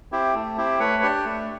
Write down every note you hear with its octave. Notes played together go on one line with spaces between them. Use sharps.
C4 E4 G4
A3
C4 E4 G4
A3 B4 C#5
D4 G4
A3